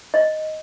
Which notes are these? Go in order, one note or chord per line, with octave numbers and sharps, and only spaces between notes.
D#5